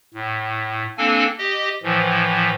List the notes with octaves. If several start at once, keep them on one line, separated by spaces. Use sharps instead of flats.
A2
A#3 C4 D4 A4 G#5
G4 D#5
A2 E3 F3